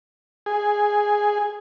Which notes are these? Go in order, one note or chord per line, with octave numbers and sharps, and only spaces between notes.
G#4